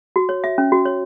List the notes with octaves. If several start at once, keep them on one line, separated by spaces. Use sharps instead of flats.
F#4
C#5
E5
C#4
F#4
C#5